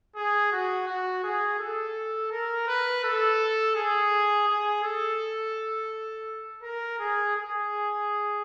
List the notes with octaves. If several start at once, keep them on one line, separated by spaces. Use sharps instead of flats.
G#4
F#4
F#4
G#4
A4
A#4
B4
A4
G#4
G#4
A4
A#4
G#4
G#4